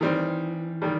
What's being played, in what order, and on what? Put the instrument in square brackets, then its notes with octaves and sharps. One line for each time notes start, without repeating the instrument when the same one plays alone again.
[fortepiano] D#3 G3 C4 [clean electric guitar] E3
[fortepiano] D#3 G3